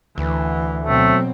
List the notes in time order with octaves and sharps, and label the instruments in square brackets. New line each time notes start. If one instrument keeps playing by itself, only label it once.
[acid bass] D2 [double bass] E3
[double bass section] B2 F#3 C4 [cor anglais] A3